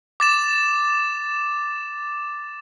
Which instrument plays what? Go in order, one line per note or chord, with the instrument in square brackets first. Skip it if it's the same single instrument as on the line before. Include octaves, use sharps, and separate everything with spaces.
[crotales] D6 A6 E7